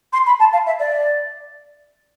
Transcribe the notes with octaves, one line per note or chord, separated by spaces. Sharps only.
C6
B5
A5
F5
E5
D5